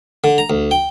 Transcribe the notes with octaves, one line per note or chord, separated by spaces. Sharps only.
D3
A#5
D2
G5